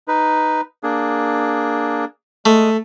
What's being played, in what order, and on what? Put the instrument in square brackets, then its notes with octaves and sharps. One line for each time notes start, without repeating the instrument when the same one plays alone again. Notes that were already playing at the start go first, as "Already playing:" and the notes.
[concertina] D#4 B4
A#3 D4 G#4
[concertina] G#3 D#6 [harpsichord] A3